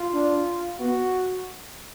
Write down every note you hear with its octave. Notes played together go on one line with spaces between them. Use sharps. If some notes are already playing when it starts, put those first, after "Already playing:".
Already playing: F4
D4
B3 F#4